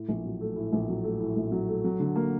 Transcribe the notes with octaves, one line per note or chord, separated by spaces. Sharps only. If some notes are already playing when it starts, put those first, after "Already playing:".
Already playing: A2
A#1
F#3
A3
A2
A#1
F#3
A3
A2
A#1
F#3
A3
F#3
D3
A#3